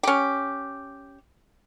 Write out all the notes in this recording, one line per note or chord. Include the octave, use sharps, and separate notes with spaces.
C#4 G4